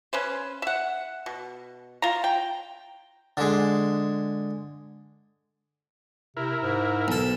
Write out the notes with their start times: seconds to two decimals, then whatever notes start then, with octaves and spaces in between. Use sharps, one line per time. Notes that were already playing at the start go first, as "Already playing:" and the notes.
0.13 C#4 B4 C5
0.62 E5 F#5
1.26 B2
2.02 F4 A#5
2.24 G5
3.37 D3 G#3
6.37 C3 E4 A#4
6.63 G#2
7.08 B1 A4